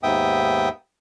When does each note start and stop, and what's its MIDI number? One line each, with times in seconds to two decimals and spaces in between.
0.03 0.69 39
0.03 0.69 44
0.03 0.69 59
0.03 0.69 76
0.03 0.69 79
0.03 0.69 87